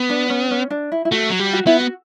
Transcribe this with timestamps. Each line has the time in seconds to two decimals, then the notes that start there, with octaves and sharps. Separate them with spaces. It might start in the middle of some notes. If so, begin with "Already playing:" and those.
Already playing: B3
0.10 D4
0.30 C#4
0.51 C#4
0.70 D4
0.92 E4
1.05 E4
1.12 A3 F#4
1.30 F#3
1.39 G3
1.53 F#4
1.67 B3 E4
1.80 F#4